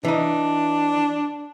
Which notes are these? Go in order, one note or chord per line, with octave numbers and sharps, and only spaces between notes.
E3 D4 D#4